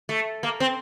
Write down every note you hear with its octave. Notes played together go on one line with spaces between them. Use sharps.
A3
A#3
C4